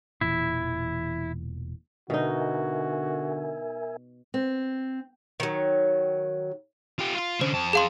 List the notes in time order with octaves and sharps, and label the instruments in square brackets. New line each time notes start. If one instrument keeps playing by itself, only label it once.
[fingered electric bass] E1 A#2 E3 [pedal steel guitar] E4
[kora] B2 D#4 [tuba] D3 [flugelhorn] F#4 [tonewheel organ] A#4 E5 G#5
[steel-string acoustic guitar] C4
[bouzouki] D#3 F#3
[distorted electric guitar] F4 G4
F4
[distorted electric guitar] D3 C#4 [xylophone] C5
[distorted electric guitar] F2 A5
[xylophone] G#4 F5 C6